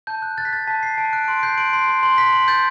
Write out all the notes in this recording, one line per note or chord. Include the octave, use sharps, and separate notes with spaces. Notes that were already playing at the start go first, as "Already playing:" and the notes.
A5 G6
F#6
F#6 A6
B6
F#6 A6
A5 B6
A5 C7
A5 D7
F#6 D7
C6 D7
G6 C7
C6 D7
C6 C7
C6 C7
C6
C6 B6
C6
G6 A6